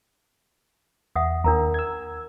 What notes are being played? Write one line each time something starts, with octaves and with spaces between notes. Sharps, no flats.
E2 E5 F#5 D#6
D#2 D4 A#4 A#5
E6 G#6